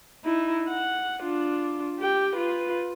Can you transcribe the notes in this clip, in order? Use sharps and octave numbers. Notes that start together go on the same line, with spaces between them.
D#4 E4
F#5
D4 F4
G4 G5
F4 B4